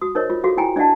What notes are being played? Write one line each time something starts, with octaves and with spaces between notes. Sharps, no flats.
F#4 D#6
D#4 A#4 C5 C#5 D#5
F4
F#4 G#4 A4 F5
E4 G5 G#5 A#5
D4 D5 D#5 F5 F#5 A5